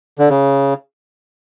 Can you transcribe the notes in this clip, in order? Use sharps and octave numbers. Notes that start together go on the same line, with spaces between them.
D3
C#3